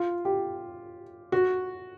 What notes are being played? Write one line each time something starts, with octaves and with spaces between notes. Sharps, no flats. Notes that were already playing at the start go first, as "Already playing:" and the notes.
Already playing: F4
G4
F#4